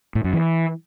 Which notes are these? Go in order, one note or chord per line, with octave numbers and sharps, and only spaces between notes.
A2
F#2
E3